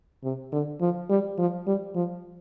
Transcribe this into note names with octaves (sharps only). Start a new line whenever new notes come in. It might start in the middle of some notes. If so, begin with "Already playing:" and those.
C3
D3
F3
G3
F3
G3
F3